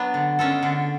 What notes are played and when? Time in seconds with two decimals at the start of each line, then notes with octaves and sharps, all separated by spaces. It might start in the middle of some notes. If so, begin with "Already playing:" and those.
Already playing: F#3 B3 D4
0.14 D3
0.39 G#3 C#4 F4 A4
0.63 D3